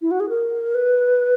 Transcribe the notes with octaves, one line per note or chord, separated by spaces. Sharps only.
E4
F#4
G#4
A#4
B4